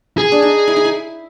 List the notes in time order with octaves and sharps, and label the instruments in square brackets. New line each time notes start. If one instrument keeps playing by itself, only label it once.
[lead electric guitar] G#4
[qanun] D4
D#4
E4
D#4
E4